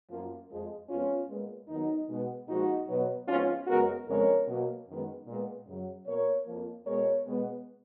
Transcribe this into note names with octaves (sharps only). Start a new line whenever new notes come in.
F#2 F3 A#3
F2 F3 G#3
F2 F3 G#3 B3 C#4 F4
A#2 G#3 B3
D#2 D#3 F#3 B3 D#4
B2 G#3 B3
A#2 F3 G#3 D#4 F#4
B2 F#3 B3
G#2 F3 B3 C#4 F4
F#2 C#3 G#3 B3 F#4 A#4
F2 C#3 F3 G#3 B3 A#4 C#5
B2 F#3 A#3
F#2 D#3 G#3 B3
A#2 G#3 B3
F#2 C#3 F#3
B2 A#3 A#4 C#5
F2 F3 A#3
B2 G#3 B3 A#4 C#5
B2 G#3 B3